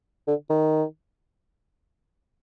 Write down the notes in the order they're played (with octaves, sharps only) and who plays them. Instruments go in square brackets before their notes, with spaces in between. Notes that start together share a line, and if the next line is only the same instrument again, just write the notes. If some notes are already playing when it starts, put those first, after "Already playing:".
[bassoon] D3
D#3